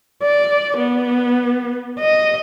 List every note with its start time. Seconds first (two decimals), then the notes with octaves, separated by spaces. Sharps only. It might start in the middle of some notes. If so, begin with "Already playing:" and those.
0.22 D5
0.78 B3
2.00 D#5